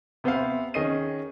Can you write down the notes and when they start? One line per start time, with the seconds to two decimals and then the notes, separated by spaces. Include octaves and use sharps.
0.24 C3 B3 C5 E5 F5
0.74 D#3 C#4 G#4 D#5 C7 D#7